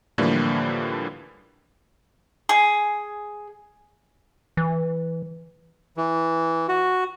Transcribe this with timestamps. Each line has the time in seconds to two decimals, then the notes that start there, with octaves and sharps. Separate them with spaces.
0.18 A2 D3 E3 F3 G3 A#3
2.49 G#4
4.57 E3
5.97 E3
6.69 F#4